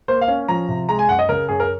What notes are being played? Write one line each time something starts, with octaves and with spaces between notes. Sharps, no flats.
A#3 C5
F5
C#4
F3 A#5
C3
G#3 A#5
G#5
F#2 F#5
D#5
C#3 A#4
F#2 G#4
A#4